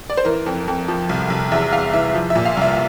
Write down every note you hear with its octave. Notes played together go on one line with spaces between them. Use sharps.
D5
C5
E3 A#4
F2
F2
F3
C2
C2
E2 E5
E2 F5
E3 E5
F3
E5
A#2
F5
C2 E5